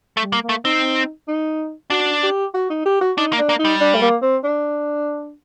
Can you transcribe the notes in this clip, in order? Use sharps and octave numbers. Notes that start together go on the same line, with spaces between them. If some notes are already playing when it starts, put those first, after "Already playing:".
A3
G3
A#3
A#3
A3
C4 D#4
D#4
D4 F#4
G4
F#4
D#4
G4
F#4
D4 D#4
A#3
D4
A#3
D#4
G3
D4
A3
A#3
C4
D4